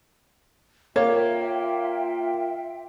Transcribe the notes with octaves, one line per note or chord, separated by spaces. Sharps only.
A#3 F4 C#5 E5 G5